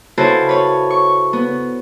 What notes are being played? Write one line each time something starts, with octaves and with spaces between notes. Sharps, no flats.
C#3 E4 F#4 A4 B4 C5
B4 C#5
C#6
B3